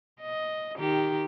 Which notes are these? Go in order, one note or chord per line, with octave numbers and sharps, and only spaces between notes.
D#5
D#3 D#4 G4